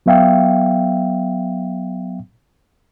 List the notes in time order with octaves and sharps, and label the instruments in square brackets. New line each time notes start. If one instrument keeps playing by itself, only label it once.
[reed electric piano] F#3 B3 E5 F5 G5